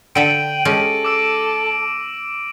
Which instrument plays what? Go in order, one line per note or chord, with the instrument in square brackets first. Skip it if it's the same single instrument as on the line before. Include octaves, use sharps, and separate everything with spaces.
[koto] D3 A4 E5 [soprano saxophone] G5 [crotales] D7 D#7 F#7
[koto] G#3 C#4 G4 [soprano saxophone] A4 [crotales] A#6
[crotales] D6 E6 D7